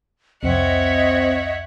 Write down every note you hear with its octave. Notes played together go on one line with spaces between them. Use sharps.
C2 F2 C4 C#5 D#5 E5 F#5